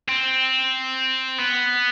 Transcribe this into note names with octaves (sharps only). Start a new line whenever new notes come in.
C4
B3